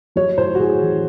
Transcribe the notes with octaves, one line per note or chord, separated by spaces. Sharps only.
F#3 C#5
A2 C5
F#4
A2 G#4
A1